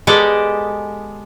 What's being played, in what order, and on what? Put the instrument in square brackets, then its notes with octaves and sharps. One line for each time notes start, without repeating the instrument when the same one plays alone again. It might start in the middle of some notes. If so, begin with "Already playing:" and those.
[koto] G#3 B3 G4 A4 D5 D#5